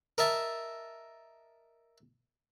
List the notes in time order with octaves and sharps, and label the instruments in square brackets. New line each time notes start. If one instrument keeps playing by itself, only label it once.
[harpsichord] A#4 D#5 E5 A5